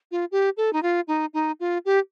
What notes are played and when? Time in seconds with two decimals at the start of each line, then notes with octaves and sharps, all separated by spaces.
0.11 F4
0.32 G4
0.57 A4
0.73 D#4
0.83 F4
1.08 D#4
1.34 D#4
1.60 F4
1.85 G4